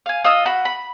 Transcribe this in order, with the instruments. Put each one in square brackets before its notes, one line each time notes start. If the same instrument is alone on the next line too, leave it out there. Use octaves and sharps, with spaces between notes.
[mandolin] F5 G#5
F4 D#5 D#6 E6
F#4 B5
B5